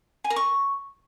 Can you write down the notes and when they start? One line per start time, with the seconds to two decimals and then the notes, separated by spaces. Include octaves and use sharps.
0.24 G#5
0.30 A#4
0.36 C#6